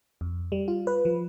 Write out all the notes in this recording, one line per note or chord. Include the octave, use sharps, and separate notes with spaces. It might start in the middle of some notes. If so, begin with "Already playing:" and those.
F2
G3
F4
B4
F3